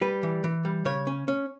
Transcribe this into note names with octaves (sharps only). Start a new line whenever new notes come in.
G3 B4
E3
E3
G3
C#3 C#5
C#4
C#4